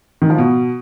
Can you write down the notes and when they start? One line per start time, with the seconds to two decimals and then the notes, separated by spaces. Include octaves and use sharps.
0.22 D#3
0.30 F3
0.38 B2